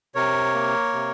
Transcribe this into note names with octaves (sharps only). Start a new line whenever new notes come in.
C3 A#4 C#5
A#3
C3